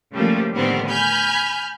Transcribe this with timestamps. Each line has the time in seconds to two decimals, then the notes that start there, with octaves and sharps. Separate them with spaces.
0.13 C#3 F3 G3 A3 A#3
0.54 A2 D3 D#3 G3 B3 C4
0.89 G#5 B5 F6 G6